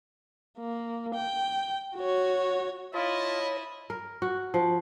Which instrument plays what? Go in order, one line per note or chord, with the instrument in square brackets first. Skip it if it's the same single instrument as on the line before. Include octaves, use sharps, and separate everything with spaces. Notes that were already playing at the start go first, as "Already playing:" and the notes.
[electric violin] A#3
G5
F#4 C#5
[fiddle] E4 [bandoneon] F4 [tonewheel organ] C#5 A5 B5 [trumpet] D#5
[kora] A#4
F#4
F3